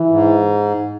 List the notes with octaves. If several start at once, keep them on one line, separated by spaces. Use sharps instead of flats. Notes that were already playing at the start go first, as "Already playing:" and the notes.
Already playing: E3
G#2